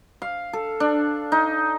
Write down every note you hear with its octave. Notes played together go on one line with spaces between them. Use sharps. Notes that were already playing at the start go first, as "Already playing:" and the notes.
F5
A4
D4
D#4